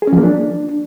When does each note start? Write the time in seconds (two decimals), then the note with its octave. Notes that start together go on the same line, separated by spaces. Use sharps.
0.02 G#4
0.07 C#4
0.13 F3
0.18 A#3
0.23 D4